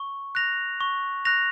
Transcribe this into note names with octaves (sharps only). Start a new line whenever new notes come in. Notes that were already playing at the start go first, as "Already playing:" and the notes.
Already playing: C#6
F#6 A#6 F7
C#6
F#6 A#6 F7